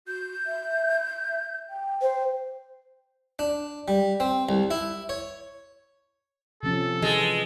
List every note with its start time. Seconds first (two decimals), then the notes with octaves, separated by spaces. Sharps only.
0.07 F#4 G6
0.46 E5
1.70 G5
2.02 C5
3.39 D4
3.88 G3
4.20 C4
4.49 C2
4.71 E4
5.09 C#5
6.63 C3 F3 C#4 A4
7.02 E3 G#3